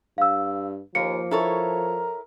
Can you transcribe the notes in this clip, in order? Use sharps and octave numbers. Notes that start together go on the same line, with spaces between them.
G2 F5 E6
D#2 F3 A#3 C#7
E4 A4 A#4 C#5